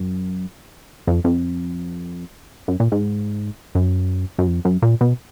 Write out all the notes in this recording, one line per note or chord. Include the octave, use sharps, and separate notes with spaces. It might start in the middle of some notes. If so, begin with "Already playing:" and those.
Already playing: F#2
F2
F2
F#2
A#2
G#2
F#2
F#2
F2
F#2
A#2
B2